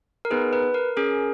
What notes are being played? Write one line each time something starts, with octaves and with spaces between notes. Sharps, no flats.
A#4
B3 D#4 G#4 B4
B4
A#4
C#4 G#4 A#4